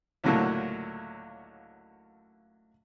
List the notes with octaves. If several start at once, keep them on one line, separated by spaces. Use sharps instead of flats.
C#2 A2 D3 F#3 A3 A#3